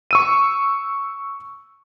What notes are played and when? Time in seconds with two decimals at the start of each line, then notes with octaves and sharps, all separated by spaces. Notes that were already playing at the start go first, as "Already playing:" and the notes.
0.11 C#6 E6 D#7